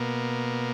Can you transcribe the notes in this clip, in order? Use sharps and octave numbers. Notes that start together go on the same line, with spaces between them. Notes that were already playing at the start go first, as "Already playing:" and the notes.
Already playing: B2 A#3